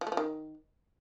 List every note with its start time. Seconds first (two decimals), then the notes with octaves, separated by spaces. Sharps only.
0.01 F3
0.07 A3
0.12 F3
0.17 D#3